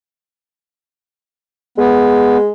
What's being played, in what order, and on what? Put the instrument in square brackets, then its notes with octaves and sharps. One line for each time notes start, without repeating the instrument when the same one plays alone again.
[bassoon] G#3 [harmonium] B3